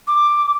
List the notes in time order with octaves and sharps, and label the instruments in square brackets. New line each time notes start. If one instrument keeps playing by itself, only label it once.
[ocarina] D6